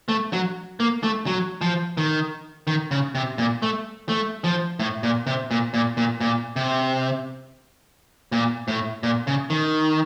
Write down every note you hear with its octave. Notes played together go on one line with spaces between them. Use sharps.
A3
F#3
A#3
A3
F#3
F3
D#3
D#3
C#3
C3
A#2
A3
A3
F3
A2
A#2
C3
A#2
A#2
A#2
A#2
C3
A#2
A2
A#2
C#3
D#3